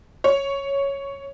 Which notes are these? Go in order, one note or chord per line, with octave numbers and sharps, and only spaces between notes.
C#5